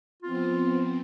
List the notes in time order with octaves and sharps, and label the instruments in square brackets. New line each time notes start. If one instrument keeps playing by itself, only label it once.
[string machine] F3 B3 C4 [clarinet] F4